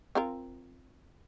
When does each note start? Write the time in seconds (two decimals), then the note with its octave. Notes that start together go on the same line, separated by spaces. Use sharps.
0.15 C4 F4 A#4